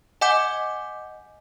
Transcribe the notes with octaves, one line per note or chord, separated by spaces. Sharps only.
D#5 F#5 G#5 D6 G6